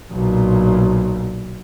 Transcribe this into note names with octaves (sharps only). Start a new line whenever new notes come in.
B1 A#2